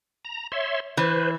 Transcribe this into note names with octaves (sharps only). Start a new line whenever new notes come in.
A#5
C#5 E5 C6
E3 B4 C5